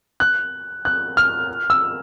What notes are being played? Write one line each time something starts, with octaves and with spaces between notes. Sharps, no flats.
F#6
F#6
F6
E6